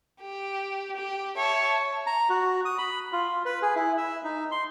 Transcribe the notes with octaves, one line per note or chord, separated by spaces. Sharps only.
G4
G4
C#5 E5 A5
A#5
F#4
D#6
B5
F4
B4
G#4
E4
E5
D#4
C6